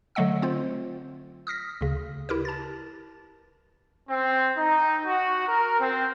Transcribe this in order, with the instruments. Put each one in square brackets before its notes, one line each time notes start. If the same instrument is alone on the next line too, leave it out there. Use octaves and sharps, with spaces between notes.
[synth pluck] D3 F#3 A3 D#5 F#5 E6
C4 F4 C5
D#6 F6 A#6 B6
D2 C#3
E4 G4 A#4 B4
A5 A6
[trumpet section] C4
D#4
F#4
A#4
C4